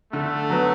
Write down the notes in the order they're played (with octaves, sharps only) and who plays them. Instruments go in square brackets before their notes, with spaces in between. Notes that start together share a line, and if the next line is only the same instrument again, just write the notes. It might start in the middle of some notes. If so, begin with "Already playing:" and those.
[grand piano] D3 [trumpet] A3
[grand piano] F#3 B3